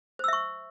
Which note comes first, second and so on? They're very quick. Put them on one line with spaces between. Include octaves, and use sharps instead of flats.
C5 E6 E5 C#6